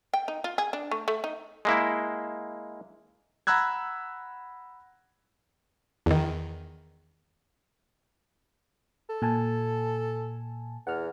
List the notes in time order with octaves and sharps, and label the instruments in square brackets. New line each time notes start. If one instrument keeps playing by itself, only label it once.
[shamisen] G5
D#4
F4
G#4
D4
A3
A3
D#4
[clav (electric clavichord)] G#3 A#3 E4
[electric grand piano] F#5 A#5 B5 E6 F#6 G#6
[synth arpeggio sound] E2 D#3
[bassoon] A4
[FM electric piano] A#2 G#5 A5
[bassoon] E2 [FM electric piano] F#5 F6